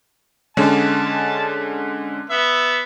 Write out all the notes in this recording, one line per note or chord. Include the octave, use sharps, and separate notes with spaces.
D3 G#3 C#4 A5
B3 E5